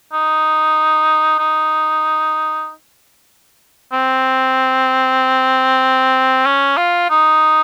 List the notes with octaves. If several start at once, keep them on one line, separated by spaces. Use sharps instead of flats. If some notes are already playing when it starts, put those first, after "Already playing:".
D#4
D#4
C4
C#4
F4
D#4